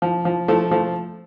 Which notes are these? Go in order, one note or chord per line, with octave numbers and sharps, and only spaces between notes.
F3
F3
F3 A3
F3 A3